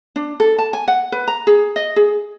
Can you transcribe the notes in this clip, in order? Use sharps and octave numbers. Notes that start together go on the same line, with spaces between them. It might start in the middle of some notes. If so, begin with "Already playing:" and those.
D4
A4
A5
G#5
F#5
B4
A#5
G#4
D#5
G#4